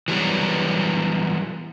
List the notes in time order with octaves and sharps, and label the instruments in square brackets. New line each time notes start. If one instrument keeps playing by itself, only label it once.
[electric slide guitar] E3 F#3 G3 B3